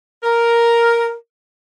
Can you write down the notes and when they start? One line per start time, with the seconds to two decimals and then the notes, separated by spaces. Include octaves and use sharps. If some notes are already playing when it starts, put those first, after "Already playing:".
0.23 A#4